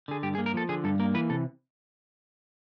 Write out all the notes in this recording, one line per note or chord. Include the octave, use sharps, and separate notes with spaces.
D3 G#4
G2 G4
G#4
A#3
A#4
F3 A4
D3 G#4
G2 A4
A#3 A#4
E3 B4
C3 A4